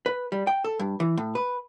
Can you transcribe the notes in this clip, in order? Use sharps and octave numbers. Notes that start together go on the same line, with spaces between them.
B4
G3
G5
A4
G2
E3
A2
B4